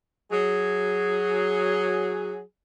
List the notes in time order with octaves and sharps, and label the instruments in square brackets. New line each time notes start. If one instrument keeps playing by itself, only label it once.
[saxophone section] F#3 G#4